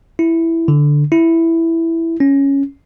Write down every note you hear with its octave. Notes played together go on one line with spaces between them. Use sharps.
E4
D3
E4
C#4